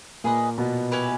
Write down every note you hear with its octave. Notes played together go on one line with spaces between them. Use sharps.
A#2 A#3 G#4 B4 D#5
B2 B3
C#4 E4 G4 B4